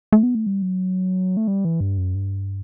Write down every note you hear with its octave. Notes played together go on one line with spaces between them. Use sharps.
A3
B3
A3
G3
F#3
A3
G3
E3
G2
F#2
G2